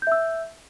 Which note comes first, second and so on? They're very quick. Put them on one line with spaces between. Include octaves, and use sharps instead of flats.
G6 E5 E6